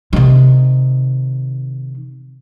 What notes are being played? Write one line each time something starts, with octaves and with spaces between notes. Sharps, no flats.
C3 D#3